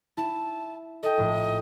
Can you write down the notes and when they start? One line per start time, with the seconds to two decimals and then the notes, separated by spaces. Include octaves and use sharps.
0.17 E4 A5
1.03 A4 D#5 G5
1.18 A#1 A2